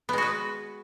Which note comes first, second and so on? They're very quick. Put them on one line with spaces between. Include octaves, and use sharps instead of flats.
B3 G#3 F#4 B4